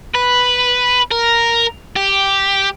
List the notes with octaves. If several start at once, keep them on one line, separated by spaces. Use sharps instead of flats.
B4
A#4
G4